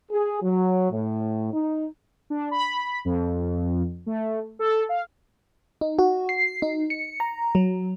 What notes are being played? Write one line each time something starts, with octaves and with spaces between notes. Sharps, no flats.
G#4
F#3
A2
D#4
D4
B5
F2
A3
A4
F5
D#4
F#4
C7
D#4
C#7
A#5
F#3